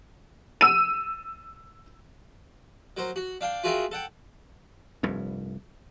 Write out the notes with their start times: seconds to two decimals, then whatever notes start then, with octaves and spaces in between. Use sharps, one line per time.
0.61 E6 D#7
2.97 F#3 A#4 C5
3.16 F#4
3.41 D4 F5 G5
3.64 F4 F#4 G#4 A#4 E5 G5
3.92 A4 F#5 G5
5.03 F1 C2 G2